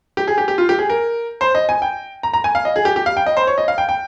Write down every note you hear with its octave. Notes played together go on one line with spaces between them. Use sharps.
G4
G#4
G4
G4
F4
G4
G#4
A#4
C5
D#5
G#5
G5
A#5
A#5
G#5
F5
D#5
G#4
G4
G4
F5
G5
D#5
C5
C#5
D#5
F5
G5
G5